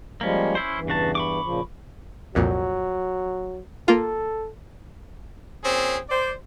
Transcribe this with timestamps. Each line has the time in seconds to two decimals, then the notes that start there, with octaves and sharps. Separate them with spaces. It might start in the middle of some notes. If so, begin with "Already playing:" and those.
0.21 F3 G3 G#3 A#3 C#4
0.55 C#4 E4 C5
0.75 E2 G2 E3
0.88 C#3 F#4 A5
1.15 B5 C#6 D6
1.43 A#2 C#3 F3
2.35 C2 F2 A#2 F#3
3.88 A#3 F4 A4
5.64 A#2 C4 C#4 G#4
6.09 C5 D5